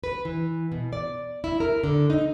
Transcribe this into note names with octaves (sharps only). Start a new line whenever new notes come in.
B4
E3
B2
D5
E4
A#4
D3
D#4